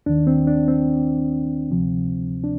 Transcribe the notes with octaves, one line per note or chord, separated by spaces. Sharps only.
D#2 D#3 D4
C4
D4
C4
D2 C3 F3
D4